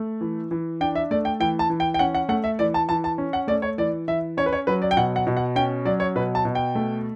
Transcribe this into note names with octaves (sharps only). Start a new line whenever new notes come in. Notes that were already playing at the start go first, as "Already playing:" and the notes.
Already playing: A3
E3
E3
D4 G5
E5
A3 D5
G5
E3 G5
A5
E3
G5
G5
C#4 F#5
F#5
A3 F#5
E5
E3 D5
A5
E3 A5
A5
C#4
F#5
A3 D5
C#5
E3 D5
E3 E5
C#4 C#5
B4
C#5
F#3 B4
D5
G5
B2 F#5
F#5
B2
F#5
C#4 G5
F#3 D5
C#5
B2 B4
A5
B2
G5
A3